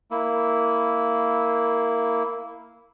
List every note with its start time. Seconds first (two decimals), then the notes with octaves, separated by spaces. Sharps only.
0.11 A#3 E4